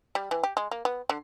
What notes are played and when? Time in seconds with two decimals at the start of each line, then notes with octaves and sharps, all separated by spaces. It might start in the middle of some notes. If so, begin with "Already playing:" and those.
0.15 G3
0.31 E3
0.43 G4
0.57 G#3
0.71 A#3
0.85 B3
1.10 D3